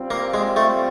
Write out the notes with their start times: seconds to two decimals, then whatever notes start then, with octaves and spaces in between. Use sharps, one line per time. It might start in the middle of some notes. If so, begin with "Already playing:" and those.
Already playing: G3 C4 F4
0.11 A#3
0.34 G#3
0.56 A3